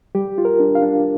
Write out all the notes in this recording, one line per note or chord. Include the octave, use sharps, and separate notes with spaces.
G3 G4
F4
A#4
D4
F5
D4